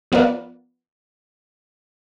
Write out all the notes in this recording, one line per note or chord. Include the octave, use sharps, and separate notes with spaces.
F3 B3 F4 A#4 B4 D5